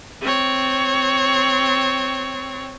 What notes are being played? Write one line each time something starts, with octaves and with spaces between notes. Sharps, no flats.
C4 C#5